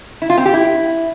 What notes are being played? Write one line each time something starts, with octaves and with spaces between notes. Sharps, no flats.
E4
F4
C4
G4
E4